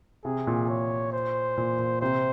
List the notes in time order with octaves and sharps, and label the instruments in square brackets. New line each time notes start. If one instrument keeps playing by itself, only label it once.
[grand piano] C3 [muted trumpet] G#4
[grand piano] A#2
[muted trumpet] C#5
C5
[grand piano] A#2
A#2
[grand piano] C3 [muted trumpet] C5